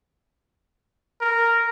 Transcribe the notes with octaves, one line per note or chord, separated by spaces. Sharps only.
A#4